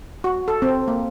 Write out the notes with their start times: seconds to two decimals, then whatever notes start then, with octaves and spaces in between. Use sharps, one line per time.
0.24 F#4
0.48 A4
0.62 C4
0.88 A#3